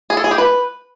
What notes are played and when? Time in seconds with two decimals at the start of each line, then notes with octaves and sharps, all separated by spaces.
0.10 G#4
0.17 A4
0.24 G#4
0.31 G4
0.38 B4